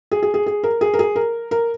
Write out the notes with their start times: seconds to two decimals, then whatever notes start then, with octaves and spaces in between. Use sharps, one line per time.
0.11 G#4
0.23 G#4
0.34 G#4
0.47 G#4
0.63 A#4
0.81 G#4
0.94 A#4
0.99 G#4
1.16 A#4
1.51 A#4